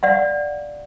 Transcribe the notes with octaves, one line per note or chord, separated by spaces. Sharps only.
D5 F5 F#5